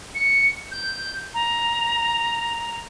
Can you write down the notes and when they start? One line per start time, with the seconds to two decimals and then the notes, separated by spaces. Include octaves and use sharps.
0.15 C#7
0.71 G6
1.34 A#5